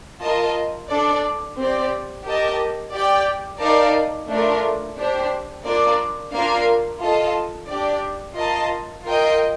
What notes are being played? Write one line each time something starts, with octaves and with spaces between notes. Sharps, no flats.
F4 A#4 D#5 A5
D4 A4 D5
C4 G4 D5
G4 A#4 D#5 A5
G4 D5 G5
D#4 A#4 D5 F5 A5
A3 D4 F4 A#4
D4 G4 C5
A#3 D4 F4 A#4 D5
A#3 D4 F4 A#4 F5
F4 A4 D#5 A5
D4 G4 D5
F4 A#4 D#5 A5
F4 A#4 D#5 G5